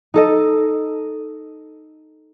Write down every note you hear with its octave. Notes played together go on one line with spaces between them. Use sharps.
D#4 A4 D#5